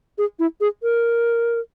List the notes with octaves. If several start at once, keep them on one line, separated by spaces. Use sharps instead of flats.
G#4
E4
G#4
A#4